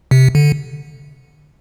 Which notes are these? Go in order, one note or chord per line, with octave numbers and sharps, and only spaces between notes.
C3
D3